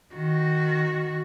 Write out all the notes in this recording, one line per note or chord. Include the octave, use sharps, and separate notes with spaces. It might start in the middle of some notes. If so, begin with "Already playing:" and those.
D#3 F#4